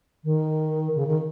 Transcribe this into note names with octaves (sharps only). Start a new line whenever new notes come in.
D#3
C#3
D#3